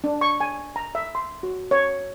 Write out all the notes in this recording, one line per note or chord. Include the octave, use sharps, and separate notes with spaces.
D4
C#6
G#5
A#5
E5
C6
F#4
C#5